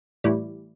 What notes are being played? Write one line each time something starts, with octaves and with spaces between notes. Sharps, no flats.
A2 E3 G3